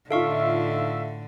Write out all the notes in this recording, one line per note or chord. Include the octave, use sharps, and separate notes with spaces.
A2 D3 D#4 F4 A4 E5 F5 C#6